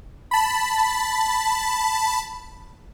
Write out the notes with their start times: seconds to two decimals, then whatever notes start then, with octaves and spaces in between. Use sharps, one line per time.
0.31 A5 B5